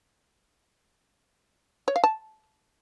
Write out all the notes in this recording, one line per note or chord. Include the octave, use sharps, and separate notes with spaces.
C#5
F5
A5